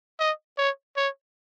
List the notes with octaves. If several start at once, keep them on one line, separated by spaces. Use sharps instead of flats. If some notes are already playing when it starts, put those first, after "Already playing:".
D#5
C#5
C#5